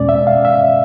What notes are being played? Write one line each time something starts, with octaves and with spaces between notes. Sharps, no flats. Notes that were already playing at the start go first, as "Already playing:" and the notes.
Already playing: E2 B2 G#3 C#4 D5
E5
F5
E5